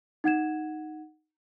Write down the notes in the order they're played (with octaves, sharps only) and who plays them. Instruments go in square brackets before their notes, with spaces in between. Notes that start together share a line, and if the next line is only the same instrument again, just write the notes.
[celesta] D#4 F#5 G#6 E7